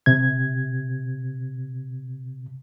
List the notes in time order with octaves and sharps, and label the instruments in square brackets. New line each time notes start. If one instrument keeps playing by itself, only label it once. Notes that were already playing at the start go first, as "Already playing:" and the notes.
[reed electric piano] C3 G#6